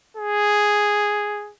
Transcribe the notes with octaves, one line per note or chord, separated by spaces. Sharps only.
G#4